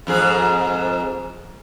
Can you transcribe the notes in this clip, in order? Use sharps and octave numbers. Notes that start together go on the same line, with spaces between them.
F2 G#2 G#4